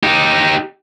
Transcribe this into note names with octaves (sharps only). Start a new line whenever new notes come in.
D#4 G4